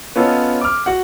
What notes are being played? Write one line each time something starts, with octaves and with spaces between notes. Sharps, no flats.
B3 C#4 F4 A4 C#5 D#5
D6 F6
F#4 F#5